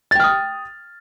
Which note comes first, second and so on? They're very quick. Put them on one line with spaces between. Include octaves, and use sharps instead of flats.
A6 G5 F6 D#6